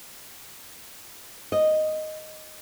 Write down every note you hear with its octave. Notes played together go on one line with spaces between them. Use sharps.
D#5